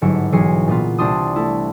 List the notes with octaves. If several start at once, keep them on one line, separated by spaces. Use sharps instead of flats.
G1 G#2 F#3 E4 C#7 D7
B1 E3 G#4 C7 C#7
A#2 B3 F4
C2 G3 D4 C6 D#6
A3 E4